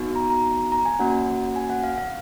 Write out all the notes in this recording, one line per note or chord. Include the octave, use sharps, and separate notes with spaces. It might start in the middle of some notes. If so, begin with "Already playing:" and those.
Already playing: B3 D#4 F#4
A#5
A#5
A#5
G#5
A#3 C#4 F#4 F#5
G#5
F#5
F5
F5